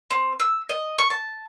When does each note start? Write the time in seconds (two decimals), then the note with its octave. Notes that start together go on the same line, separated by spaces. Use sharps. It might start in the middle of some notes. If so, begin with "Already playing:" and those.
0.11 C4
0.40 E6
0.69 D#5
0.98 C#6
1.10 A5